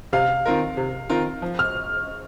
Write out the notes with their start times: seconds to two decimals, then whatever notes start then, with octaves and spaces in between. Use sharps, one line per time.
0.13 C3 F5
0.45 D#3 C4 F4 A#4
0.77 C3
1.10 D#3 C4 F4 A#4
1.42 F3
1.59 F6